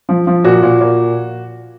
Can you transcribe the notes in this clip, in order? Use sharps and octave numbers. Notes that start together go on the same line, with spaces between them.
F3
F3
A#2 F#4
A#2
A#2